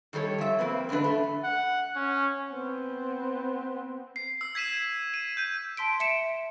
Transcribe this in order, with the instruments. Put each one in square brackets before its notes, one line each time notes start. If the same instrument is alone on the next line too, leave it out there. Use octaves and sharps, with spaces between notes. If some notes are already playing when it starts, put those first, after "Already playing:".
[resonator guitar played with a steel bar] D#3 G3 A4 C5 C#5
F3 E5
F2 A#3 C4 B4
E2 G#2 D3 D4 B4
A3
[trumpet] F#5
C#4
[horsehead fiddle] B3 C4
[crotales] C7
E6
G#6 B6 D#7 E7
D#7
G6 D#7
[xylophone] A5 C6 B6 D7
E5 C#7 D7 E7